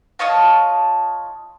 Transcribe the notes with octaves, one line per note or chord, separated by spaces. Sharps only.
F4 C#5 D#5 A5